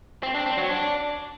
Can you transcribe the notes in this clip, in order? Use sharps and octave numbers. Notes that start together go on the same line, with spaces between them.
C4
D4
C4
F#3
D4